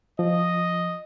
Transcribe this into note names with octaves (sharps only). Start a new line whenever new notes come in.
F3 D#5